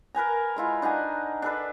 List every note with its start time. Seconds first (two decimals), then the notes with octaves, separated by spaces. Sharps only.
0.15 A#4 B4 G#5 A#5
0.56 G#3 E4 F4
0.82 D4 D#4 F#5 G#5
1.42 D4 A4 B4